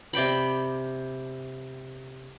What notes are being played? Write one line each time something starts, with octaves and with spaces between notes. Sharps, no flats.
C3 D5 G5 B5